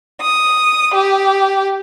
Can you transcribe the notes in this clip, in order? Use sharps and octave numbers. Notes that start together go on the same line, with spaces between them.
D#6
G4